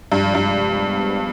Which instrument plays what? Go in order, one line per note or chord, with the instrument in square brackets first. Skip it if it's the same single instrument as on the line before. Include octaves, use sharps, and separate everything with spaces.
[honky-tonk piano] G2 [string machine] C3 F3 G#3
[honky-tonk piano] G2
[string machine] F3 G#3 B3 D4